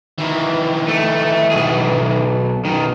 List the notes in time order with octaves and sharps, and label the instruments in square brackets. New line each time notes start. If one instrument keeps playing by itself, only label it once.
[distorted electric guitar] D#3 E3
[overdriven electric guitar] A3
B1 G#4
B1 D#3